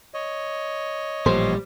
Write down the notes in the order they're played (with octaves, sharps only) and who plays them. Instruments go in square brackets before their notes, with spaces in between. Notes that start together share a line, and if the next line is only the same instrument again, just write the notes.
[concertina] C#5 D#5
[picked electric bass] A1 A#2 F3 [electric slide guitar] G3 [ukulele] C5